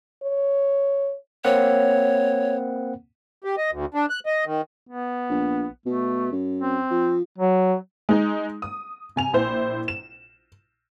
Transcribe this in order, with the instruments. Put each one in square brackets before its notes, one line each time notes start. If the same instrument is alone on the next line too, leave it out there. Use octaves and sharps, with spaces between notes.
[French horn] C#5
[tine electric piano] A#3 C4 F#5 [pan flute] C#5
[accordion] G4
D#5
D2
D4
F#6
D#5
D#3
[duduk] B3
[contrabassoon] A#1
[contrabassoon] B2 [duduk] A3
[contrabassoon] F#2
[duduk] C4
[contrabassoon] F3
[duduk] F#3
[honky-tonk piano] G#3 D#4
D#6
C3 G#5 F7
A#1 E4 C5
E7